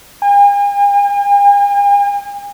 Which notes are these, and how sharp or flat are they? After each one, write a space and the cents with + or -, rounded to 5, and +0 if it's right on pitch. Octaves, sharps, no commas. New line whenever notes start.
G#5 -45